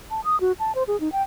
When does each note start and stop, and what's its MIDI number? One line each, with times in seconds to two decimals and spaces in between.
0.10 0.21 81
0.24 0.39 87
0.41 0.52 66
0.60 0.72 81
0.75 0.83 72
0.88 0.99 68
1.00 1.11 63
1.12 1.22 79